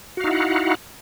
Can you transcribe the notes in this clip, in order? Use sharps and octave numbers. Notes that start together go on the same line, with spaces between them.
D#4 E4 F#4 F5 F#5